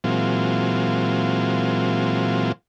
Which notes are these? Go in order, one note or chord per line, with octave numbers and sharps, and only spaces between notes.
A#2 E3 F#3 G#3 C4 F4